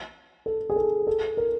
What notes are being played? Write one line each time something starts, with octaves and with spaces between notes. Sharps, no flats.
A4
G#4
A4
A4
A#4